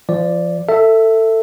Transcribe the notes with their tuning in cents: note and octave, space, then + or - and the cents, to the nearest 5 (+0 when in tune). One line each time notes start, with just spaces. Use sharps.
F3 -25 D5 +0
A4 +20 E5 +0